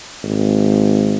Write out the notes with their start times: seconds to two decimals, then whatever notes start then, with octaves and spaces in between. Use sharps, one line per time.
0.24 G#1